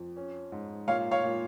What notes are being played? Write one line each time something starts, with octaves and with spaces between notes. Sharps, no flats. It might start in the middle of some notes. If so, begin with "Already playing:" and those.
Already playing: F2
C#4
G#2
A#2 C#5 F5
C#5 F5
A#2